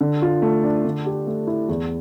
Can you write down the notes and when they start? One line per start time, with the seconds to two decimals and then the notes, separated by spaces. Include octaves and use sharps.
0.01 D3
0.22 F4
0.42 A3
0.64 D4
0.84 D3
1.06 G4
1.27 A3
1.47 E4
1.69 E2